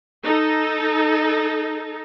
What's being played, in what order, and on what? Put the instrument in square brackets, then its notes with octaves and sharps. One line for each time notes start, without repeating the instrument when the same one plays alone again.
[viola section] D#4 A4